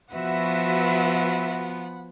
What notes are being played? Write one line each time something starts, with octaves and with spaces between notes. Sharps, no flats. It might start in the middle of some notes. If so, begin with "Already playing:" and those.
F3 B3 F#4 B4 E5 F#5 B5